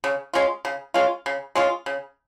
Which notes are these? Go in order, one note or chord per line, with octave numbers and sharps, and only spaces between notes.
C#3
G#3 C#4 F4
C#3
G#3 C#4 F4
C#3
G#3 C#4 F4
C#3